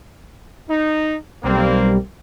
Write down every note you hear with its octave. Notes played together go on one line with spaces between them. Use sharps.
D#4
B1 G3 A#3 C4